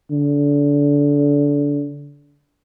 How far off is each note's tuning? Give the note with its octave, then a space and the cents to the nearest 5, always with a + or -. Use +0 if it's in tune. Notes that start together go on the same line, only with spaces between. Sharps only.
D3 -25